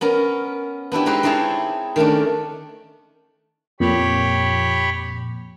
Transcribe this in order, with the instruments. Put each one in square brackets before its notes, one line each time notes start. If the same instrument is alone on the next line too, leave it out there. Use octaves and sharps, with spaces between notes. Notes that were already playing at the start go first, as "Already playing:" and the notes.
[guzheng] B3 C#4 A#4
B3 D4 E4 G4
G#3 C4 D#4 G4 B4 C5
C4 D#4 E4 G#4 C#5 A5
D#3 A3 C#4 D4
[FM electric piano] F2 A#2 [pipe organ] G4 C#5 B5